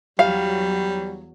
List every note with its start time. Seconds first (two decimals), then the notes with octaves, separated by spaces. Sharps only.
0.19 E2 F#3 G3 F5